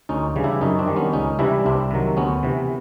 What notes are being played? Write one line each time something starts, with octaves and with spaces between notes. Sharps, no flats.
D2 C#4 D#4
C#3 E3 G3
D4 E4
F#2 C#4 D#4
C4 D4
D#3 G3
B3 C#4
C#2 C#4 D#4
C3 E3 G3 D4 E4
C2 C4 D4
C3 D#3 F#3
D2 B3 C#4
C3 E3